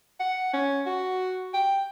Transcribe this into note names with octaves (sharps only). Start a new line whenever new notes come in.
F#5
C#4
F#4
G5